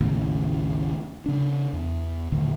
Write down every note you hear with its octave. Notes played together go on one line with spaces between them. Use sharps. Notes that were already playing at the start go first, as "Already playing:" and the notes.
A1 D#2 A2 C#3
C#3 D4
E2
D#1 B1 A2 D3